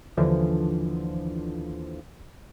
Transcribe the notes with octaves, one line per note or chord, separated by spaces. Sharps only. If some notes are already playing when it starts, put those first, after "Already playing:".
D#2 D3 E3 F3